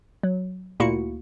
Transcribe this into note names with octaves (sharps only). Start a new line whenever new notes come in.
F#3
D2 A#2 A#3 E4 F#4 C#7